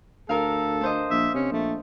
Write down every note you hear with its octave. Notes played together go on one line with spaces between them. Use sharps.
D2 A4 A#4 F5
D4 C5 D#5
A#1 E5
C3 C#4
A#1 A3